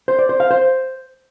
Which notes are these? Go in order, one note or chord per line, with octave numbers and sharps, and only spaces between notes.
C5
D5
C5
F5
C5